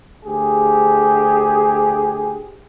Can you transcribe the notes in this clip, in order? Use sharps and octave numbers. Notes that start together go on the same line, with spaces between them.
D2 G4 G#4